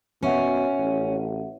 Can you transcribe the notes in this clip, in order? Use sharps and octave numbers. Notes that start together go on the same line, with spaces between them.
B2 C#4 F#4 E5 F#5
A1